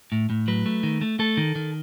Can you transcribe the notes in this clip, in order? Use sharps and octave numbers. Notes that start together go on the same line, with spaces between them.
A2
A2
F#3 B4
A3
D#3
A3
A3 A4
D#3
D#3